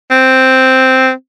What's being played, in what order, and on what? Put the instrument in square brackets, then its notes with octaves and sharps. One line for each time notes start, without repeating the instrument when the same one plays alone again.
[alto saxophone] C4